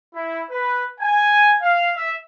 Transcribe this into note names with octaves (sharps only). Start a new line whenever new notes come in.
E4
B4
G#5
F5
E5